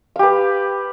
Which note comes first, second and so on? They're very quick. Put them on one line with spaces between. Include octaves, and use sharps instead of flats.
F5 G4 B4